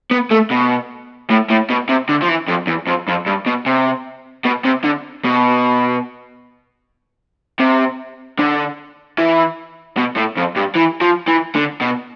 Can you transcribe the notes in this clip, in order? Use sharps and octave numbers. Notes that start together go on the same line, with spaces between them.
B3
A3
B2
A2
A2
B2
C3
D3
F3
E3
F2
E2
F2
F2
G2
B2
C3
B2
C3
D3
B2
C3
D3
E3
B2
A2
F2
G2
E3
F3
E3
D3
B2